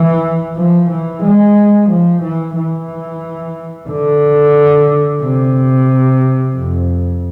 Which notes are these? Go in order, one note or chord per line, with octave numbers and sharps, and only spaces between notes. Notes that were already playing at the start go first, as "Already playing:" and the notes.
Already playing: E3
F3
E3
G#3
F3
E3
E3
D3
C3
F2